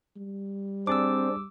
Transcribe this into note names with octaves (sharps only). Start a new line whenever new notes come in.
G3
C4 D4 G#4 D5 D6 E6